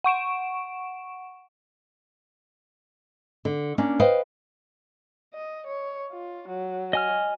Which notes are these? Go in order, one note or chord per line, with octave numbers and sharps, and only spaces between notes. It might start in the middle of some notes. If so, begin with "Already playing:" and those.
F#5 C#6 D7 E7
D3
A#3 C#4 D4
B4 C5 D#5 F5 G5
D#5
C#5
F4
F#3
D#5 G#5 F6